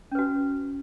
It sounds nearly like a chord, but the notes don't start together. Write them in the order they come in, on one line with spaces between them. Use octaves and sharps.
C#4 B4 F#4